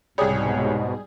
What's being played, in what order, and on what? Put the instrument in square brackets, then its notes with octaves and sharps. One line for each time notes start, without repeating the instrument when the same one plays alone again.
[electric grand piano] C2 C#5 [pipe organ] G#2 B2 [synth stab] G3 G#4